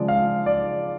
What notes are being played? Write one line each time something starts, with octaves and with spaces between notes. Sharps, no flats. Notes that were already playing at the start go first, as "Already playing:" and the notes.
Already playing: C#3 F3 G#3 D5
F5
D5